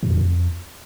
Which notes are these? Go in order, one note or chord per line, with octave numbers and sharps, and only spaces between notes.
F#2
E2
F2